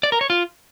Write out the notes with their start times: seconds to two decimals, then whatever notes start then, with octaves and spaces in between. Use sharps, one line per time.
0.03 D5
0.12 A#4
0.21 C#5
0.30 F4